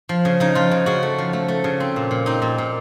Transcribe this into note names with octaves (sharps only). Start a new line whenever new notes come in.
F3
C#3
C#3 D#4
F3 F4
C#3
C#3 F#4
A3
F3
A3
A3
C#3
C4
A#2
A#2
C4 D#4
A#2
A#2